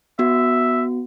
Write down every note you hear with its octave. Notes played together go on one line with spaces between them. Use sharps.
B3 F#4 E5